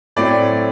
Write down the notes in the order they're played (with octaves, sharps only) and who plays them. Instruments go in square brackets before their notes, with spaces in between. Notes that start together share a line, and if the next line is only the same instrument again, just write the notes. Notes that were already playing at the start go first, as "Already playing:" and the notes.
[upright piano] A2 F#3 A3 C4 D5